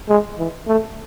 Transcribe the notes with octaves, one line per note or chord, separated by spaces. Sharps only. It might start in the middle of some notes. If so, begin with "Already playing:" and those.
G#3
E3
A3